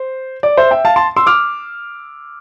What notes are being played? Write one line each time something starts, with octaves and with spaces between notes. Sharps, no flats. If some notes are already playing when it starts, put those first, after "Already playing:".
Already playing: C5
D5
C5 E5
E5 G5
F5 A5
A5 C6
C6 E6
D6 F6